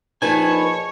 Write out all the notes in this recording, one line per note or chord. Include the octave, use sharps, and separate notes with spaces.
A#1 D#4 B4 C#5 G#5 A5